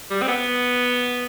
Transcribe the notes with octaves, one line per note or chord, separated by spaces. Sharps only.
G3
C4
B3